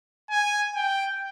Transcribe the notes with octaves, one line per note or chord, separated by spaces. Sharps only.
G#5
G5